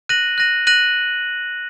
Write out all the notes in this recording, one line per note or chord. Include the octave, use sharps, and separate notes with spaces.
F#6 A#6 D#7 F#7
F#6 A#6 D#7 F#7
F#6 A#6 D#7 F#7